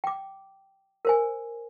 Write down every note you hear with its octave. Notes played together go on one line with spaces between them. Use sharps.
G5 D6
A#4 C5 G#5